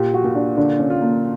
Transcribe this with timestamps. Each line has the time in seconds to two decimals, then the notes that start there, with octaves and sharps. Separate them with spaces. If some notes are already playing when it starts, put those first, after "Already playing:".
Already playing: A#2 G4
0.14 F#4
0.24 A#2
0.35 D4
0.57 D3 D4
0.79 C#4
0.90 F4
1.01 A#3